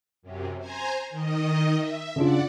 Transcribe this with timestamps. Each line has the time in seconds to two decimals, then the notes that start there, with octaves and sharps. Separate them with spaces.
0.22 F#2 C3
0.58 C5 G#5 A#5
1.10 D#3 D#5
1.78 E5
2.16 C#3 D4 F4 D5 F#5